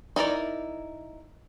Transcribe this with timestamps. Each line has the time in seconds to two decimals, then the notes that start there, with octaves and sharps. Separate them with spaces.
0.16 D#4 E4 A#4 D5